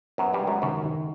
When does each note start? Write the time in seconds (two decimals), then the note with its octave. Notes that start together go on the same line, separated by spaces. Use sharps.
0.18 F#2 F#3 B3
0.33 G2 G3
0.41 G#3
0.47 F#2 F#3
0.62 F#2 D#3 F#3
0.84 D#3